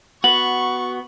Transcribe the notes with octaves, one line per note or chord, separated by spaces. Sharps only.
B3 F#4 C#6 F#7